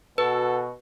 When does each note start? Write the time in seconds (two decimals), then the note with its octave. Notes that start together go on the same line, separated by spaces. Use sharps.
0.18 B2 F#4 A4 B4